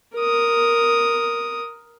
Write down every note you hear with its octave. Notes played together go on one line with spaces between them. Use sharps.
A#4 D#6